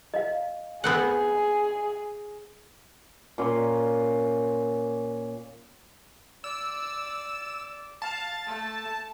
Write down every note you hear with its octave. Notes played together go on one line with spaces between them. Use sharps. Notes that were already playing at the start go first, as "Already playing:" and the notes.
D#5 F5
B3 C4 G#4 F#5
A#2 C#4 C6
D5 E6
F5 A5
A3